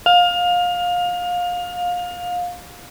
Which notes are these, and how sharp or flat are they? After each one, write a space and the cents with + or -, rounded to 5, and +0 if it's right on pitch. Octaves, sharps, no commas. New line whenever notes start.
F5 +25